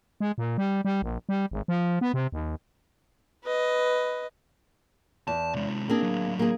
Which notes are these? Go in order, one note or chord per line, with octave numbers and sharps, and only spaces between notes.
G#3
A#2
G3
G3
A#1
G3
G#1
F3
B3
C3
D#2
B4 D#5
E2 A5
C3 G#3
A#3 C4 D4 G#4
A2 F#3
A#3 G#4